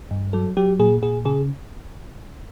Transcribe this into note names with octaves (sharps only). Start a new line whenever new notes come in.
G2
F#3 A4
F#3 G4
A#2 G#4
A#2 G#4
C#3 G#4